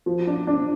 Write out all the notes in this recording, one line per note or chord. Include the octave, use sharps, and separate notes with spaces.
F3
D4
D4